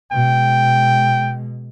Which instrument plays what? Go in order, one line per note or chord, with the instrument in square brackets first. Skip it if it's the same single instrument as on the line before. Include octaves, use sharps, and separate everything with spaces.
[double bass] B2 G#3 [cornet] G5